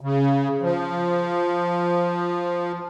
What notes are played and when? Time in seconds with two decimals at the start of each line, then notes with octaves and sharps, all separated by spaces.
0.01 C#3
0.62 F3